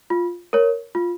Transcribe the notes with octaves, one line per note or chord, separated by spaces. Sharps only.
F4
A#4 C#5
F4